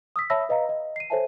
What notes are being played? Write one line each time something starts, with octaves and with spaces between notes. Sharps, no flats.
D#6 E6 B6
C#5 E5 A5 B5 E6 A#6
B4 D#5 F5 A#5
D#5
C7 D#7
A4 C5 C#5 E5 G#5 A5